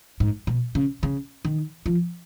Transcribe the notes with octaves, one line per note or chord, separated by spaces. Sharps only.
G#2
B2
C#3
C#3
D#3
F3